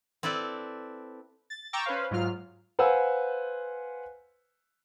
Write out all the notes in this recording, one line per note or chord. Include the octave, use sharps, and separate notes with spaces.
C4 E4 A4 B4 D5
A6
G5 A#5 C#6 D6 E6 A6
C#4 B4 C5 F5
G#2 F#3 F4 F6
B4 C5 F5 F#5 G#5 E6